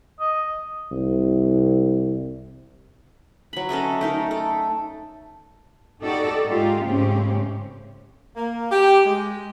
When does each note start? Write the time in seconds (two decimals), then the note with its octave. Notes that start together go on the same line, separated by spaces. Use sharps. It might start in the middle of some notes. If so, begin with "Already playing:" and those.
0.20 D#5
0.91 C2
3.53 F#3 B5
3.69 C#4 A4 D#5 E5
4.01 A3 D#4 A#4
4.31 A4
6.02 D#4 F#4 G4 A4 D5
6.47 G#2 G#3 D#4 F4 G4
6.84 G#2 C#3 A3 C4 C#4 G4
8.36 A#3
8.71 G4
9.06 G#3